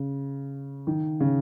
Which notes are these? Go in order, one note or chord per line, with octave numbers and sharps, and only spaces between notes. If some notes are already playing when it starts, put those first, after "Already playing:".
Already playing: C#3
D#3
C#3